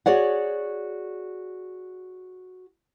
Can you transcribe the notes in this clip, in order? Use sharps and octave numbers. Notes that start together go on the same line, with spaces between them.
F#4 G#4 C#5 D5 F#5